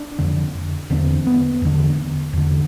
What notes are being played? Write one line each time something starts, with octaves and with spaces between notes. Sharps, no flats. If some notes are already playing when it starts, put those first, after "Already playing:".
Already playing: D4
F2 D3
E2 D3 C4
B3
E2 D3
E2 D3